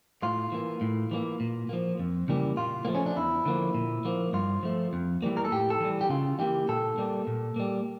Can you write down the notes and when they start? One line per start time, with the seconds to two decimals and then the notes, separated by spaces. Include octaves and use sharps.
0.23 A2 F4
0.52 E3 A#3
0.81 A2
1.11 E3 G3 A#3
1.40 A#2
1.69 F3 A#3
1.99 F2
2.28 C#3 E3 G3 A#3
2.57 A#2 F4
2.85 F3 A3 A#3
2.95 C#4
3.06 D4
3.16 E2 E4
3.45 D3 F3 A#3
3.75 A#2
4.05 F3 A#3
4.33 G2 F4
4.63 F3 A3
4.93 F2
5.22 E3 G3 A#3
5.37 A#4
5.45 A4
5.51 A2 G4
5.70 A4
5.80 E3 G3
6.01 G4
6.09 C#3 F4
6.39 E3 A#3 G4
6.68 A#2 A4
6.98 G3 A#3
7.27 A#2
7.56 G3 A#3